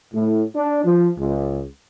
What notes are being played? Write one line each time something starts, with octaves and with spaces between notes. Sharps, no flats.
A2
D4
F3
C#2